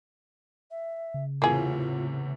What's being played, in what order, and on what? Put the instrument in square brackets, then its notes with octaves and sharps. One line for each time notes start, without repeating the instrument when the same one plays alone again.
[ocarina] E5
[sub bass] C#3
[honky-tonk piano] E2 A2 C3 [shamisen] A#3 G#4 [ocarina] F4